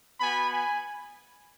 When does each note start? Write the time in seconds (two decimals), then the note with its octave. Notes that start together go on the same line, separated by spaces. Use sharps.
0.20 B3 F#4 G#5 B5
0.51 G#5 B5